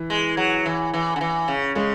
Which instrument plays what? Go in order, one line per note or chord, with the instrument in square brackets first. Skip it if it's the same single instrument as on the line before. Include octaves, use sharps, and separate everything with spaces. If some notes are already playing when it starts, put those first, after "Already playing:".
Already playing: [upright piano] E3
[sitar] G#3
F#3
E3
E3
D3
E3
C#3
[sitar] C#3 [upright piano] G#3